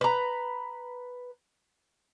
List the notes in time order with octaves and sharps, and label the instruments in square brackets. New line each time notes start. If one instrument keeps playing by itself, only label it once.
[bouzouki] B4 A#5